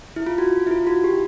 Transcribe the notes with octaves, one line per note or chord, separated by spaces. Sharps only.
E4
F4
F#4
E4
F4
F#4
G4